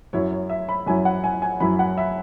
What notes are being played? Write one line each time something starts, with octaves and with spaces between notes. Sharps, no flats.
F#2 F#3 E4 C#5
C#5
E5
B5
F#2 F#3 E4 G#5
F#5
G#5
G#5
F#2 F#3 E4 B5
F#5
E5